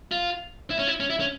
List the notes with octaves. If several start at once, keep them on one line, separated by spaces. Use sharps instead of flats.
F4
E4
C#4
E4
C#4
E4
C#4